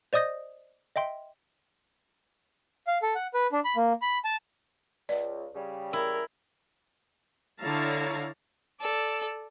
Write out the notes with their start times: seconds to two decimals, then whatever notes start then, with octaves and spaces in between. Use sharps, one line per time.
0.13 C5 D5 D#5 D#6 G6 A#6
0.96 D#5 E5 G5 C6
2.87 F5
3.02 A4
3.15 F#5
3.34 B4
3.53 D4
3.65 B5
3.76 A#3
4.02 B5
4.25 A5
5.09 C#2 D5
5.55 C#3 G3 G#4
5.93 E4 A#4
7.61 D3 E4 C#5 F5 A5 A#5
8.81 A4 D5